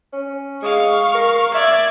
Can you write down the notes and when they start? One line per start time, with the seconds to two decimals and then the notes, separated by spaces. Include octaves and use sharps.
0.13 C#4
0.62 G#3 F5 C#6
1.15 A#4
1.54 D5 E5 G#6